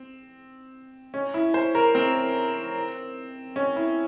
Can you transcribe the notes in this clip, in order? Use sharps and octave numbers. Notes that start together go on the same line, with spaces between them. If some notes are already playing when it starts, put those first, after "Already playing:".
Already playing: C4
C#4
E4
C5
A#4
C4
C#4
E4